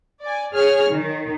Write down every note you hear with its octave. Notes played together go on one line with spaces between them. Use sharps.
D5 G#5
G#4 C#5 G#5 F6
D#3